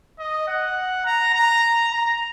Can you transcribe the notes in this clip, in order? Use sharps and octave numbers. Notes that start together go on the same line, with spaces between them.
D#5
F#5
A#5
A#5
A#5